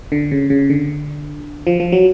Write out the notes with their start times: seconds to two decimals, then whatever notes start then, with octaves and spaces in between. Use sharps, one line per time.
0.12 D3
0.31 C#3
0.50 C#3
0.70 D3
1.67 F3
1.80 F3
1.92 F#3